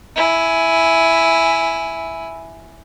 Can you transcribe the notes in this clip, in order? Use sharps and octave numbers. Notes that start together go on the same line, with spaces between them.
E4 G#5